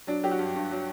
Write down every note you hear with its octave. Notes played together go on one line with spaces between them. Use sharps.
F#3 D4
F#3 G4
F#4
G2
G2
F#3